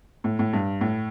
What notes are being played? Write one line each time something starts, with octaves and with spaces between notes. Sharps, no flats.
A2
A2
G2
A2